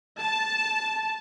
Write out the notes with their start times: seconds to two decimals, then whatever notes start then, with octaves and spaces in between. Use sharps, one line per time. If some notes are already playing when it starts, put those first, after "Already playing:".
0.19 A5